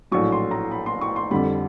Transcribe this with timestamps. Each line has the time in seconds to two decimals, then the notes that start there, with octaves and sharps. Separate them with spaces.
0.11 A#1 A2 F#3 C#6
0.32 C6
0.51 A#5
0.71 B5
0.86 C6
1.01 C#6
1.16 C6
1.31 F2 D3 G3 B5